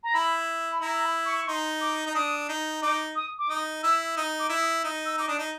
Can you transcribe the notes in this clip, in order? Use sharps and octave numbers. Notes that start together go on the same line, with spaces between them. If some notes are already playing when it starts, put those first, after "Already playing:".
A#5
E4 B5
B5
E4 A#5
A#5
B5
C#6
C#6
D#4 C6
D6
D#4
D4 D#6
D#4
D#4 D6
D#6
D6
D#4 D#6
E4 E6
D#4 D#6
D6
E4
D#6
D#4 D#6
E6
D#4 D6
D4 D#6
D#4